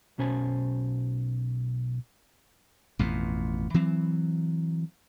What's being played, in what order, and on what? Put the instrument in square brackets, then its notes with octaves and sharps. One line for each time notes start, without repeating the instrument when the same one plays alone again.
[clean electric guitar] B1 B2 C#4 C5 G#5 A5
[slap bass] A1 F2 B2
E3 F#3 C4